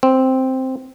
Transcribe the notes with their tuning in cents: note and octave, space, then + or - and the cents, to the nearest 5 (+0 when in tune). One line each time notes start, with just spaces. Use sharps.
C4 +0